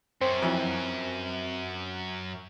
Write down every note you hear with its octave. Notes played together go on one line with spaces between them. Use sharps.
F#2 C4
F2 E3 F#3